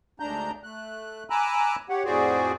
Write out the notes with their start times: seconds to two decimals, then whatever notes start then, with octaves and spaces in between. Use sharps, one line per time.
0.20 D2 G#2 D4 A#5 G6
0.64 A3 F#6
1.30 G#5 A#5 B5 D6 E6 F#6
1.89 G4 C#5 F#5
2.05 F2 A2 F#4 G#4 C5 D5